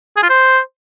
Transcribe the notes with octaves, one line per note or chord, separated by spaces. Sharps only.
G#4
F4
C5